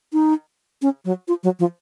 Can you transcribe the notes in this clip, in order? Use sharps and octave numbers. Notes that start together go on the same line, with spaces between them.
D#4
C#4
F#3
F4
F#3
F3